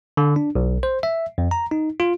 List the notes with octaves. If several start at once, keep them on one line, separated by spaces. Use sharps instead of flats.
D3
D4
B1
C5
E5
F2
A#5
D#4
F4